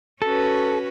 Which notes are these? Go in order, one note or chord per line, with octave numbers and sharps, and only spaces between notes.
C#4 F#4 A4 B4